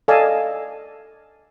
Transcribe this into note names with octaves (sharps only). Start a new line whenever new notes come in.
A4 D5 D#5 F5 G#5 A5